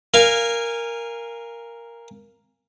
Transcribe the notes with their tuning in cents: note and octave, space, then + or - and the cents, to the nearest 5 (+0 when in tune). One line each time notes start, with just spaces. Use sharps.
A#4 +0 F5 -10 G#5 -20